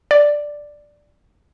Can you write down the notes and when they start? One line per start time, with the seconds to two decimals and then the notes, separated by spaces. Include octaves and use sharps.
0.11 D5